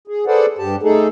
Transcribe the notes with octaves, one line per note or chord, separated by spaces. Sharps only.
G#4
G#4 A4 B4 C5 D5 F#5
G2 G4 A5
A3 D#4 G#4 A4